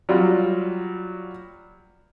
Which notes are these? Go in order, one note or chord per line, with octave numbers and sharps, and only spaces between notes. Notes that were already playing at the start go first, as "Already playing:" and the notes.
F#3 G3 F4